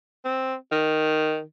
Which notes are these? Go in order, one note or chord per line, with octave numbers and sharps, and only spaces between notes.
C4
D#3